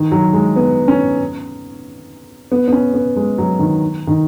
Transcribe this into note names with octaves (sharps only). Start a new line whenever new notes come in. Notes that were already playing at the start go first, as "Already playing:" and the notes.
Already playing: D#3
F#3
G#3
B3
C#4
B3
B3
C#4
B3
G#3
F#3
D#3
D#3